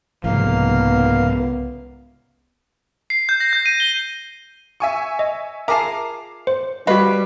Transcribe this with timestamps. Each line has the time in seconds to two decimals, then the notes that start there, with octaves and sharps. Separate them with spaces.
0.24 C2 G#2 C#3 F3 A#3 B3 F5
3.10 C7
3.29 G6
3.40 A#6
3.53 G6
3.66 D#7
3.80 G7
4.80 E5 G#5 C#6
5.19 D#5
5.68 F4 G#4 A#4 E5 A5 D6 C7
6.47 C5
6.87 G3 F4 F#4 B4 D#5